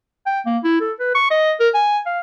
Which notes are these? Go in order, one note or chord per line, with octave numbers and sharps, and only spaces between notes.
G5
A#3
E4
A4
B4
C#6
D#5
A#4
G#5
F5